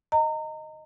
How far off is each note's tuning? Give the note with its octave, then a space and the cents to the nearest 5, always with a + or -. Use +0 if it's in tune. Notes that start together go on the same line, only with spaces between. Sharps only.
D#5 +0 A#5 -30